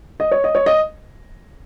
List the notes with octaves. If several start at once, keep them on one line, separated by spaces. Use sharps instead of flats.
D#5
C#5
D#5
C#5
D#5